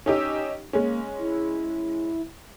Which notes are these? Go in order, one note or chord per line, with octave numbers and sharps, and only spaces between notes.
C#4 D#4 G4 E6
G#3 A#3 C#4
E4